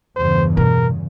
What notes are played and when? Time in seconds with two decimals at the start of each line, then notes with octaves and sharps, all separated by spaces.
0.16 E2 G2 C#3 C5
0.57 B2 A#4